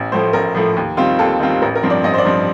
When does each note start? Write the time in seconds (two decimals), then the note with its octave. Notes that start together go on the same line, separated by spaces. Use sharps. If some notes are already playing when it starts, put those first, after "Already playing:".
Already playing: A1
0.12 A2 F3 A3 C5
0.33 A1 A#4
0.55 A2 F3 A3
0.77 D#2
0.97 D#3 G3 C4 F4
1.19 D#2 A4
1.40 D#3 G3 C4 F4
1.62 A1 A#4
1.76 A#4
1.83 G2 F3 C4
1.90 D5
2.04 A1 D#5
2.14 C5
2.18 D5
2.25 G2 F3 C4